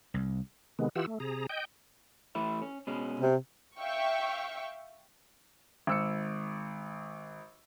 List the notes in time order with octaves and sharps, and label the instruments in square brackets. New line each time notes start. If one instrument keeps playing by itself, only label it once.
[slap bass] C2
[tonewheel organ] C3 D#3 G#3 B3
E3 F4 G4 F#5 E6
A3
C3 G#4 A#5
D#5 G5 G6
[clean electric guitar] E3 A3 E4
C#4
B2 G#3 C#4
[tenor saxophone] C3
[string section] E5 F5 G5 C#6
[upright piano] G#1 E6 C#7